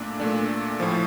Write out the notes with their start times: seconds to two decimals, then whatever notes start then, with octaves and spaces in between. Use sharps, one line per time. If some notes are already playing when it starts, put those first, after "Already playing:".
Already playing: A#2 A3 D4
0.20 A#2 A3 D4
0.80 A2 F3